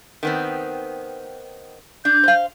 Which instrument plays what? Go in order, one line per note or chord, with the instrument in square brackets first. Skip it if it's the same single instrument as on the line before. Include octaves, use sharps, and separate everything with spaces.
[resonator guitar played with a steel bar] D#3 B3 C4
[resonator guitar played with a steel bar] D4 [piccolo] G6
[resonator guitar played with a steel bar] C5 F5